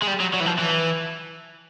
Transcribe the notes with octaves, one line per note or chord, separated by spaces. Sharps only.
G#3
G3
F#3
F#3
E3
F3
E3